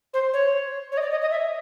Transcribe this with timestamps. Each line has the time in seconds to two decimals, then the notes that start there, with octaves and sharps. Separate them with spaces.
0.14 C5
0.33 C#5
0.92 C#5
0.97 D#5
1.01 D5
1.11 D#5
1.21 D#5
1.31 E5